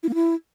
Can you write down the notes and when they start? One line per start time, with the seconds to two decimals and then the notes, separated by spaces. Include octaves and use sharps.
0.03 E4
0.09 A#3
0.14 E4